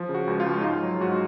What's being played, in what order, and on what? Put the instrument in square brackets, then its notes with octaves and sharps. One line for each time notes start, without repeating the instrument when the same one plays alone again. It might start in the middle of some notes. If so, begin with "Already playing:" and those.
Already playing: [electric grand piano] F3
C#3
F#4
C#2
F4
C#2
D#4
G#2 F4
F#3
G#2 F#4